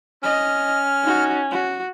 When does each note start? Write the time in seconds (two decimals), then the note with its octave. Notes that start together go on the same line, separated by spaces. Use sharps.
0.23 C#4 D#5 F6
1.03 D#4 F#4
1.51 F#4